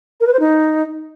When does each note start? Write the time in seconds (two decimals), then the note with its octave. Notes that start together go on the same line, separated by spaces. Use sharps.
0.20 A#4
0.27 B4
0.33 C5
0.39 D#4